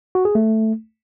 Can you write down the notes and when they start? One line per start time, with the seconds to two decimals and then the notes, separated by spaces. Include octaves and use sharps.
0.15 F#4
0.25 G#4
0.35 A3